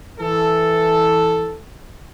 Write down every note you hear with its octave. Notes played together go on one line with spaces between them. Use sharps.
E3 A4